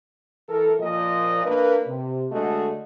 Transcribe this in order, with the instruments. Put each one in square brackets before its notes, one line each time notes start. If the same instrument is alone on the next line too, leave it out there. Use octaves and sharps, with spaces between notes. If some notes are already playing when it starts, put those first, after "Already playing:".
[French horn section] E3 A4 A#4
A#2 F3 D#5
A#3 D4 A#4 B4
C3
D3 G#3 A3 F#4 G#4 D#5